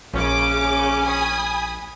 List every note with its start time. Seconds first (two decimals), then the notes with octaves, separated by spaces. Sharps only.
0.14 A#1 C#3 C#4 D6
1.04 G#5 B5 D#6